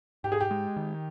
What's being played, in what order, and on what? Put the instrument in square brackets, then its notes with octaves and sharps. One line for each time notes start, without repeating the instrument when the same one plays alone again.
[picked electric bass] G#2 [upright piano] G4
[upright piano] G#4
G4
[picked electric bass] G#3
D#3